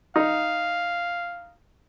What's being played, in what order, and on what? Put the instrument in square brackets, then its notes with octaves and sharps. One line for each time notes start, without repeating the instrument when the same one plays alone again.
[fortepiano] D#4 [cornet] F5